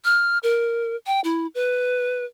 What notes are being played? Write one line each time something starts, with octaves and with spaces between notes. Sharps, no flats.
F6
A#4
G5
E4
B4